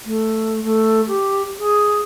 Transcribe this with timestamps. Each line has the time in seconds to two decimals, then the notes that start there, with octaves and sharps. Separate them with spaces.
0.05 A3
0.64 A3
1.07 G4
1.59 G#4